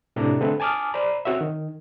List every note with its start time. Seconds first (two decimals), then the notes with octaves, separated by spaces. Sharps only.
0.16 A2 C3 D4 D5 A#5
0.40 D3 A3 C4 A4 B4
0.60 G#5 A5 D6 D#6 F6
0.94 C5 D5 A#5 B5
1.25 C4 F#4 C#5 E5
1.41 D#3